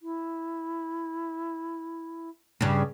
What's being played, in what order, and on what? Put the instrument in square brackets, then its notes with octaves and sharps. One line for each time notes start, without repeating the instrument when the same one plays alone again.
[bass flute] E4
[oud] G2 C#3 [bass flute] G3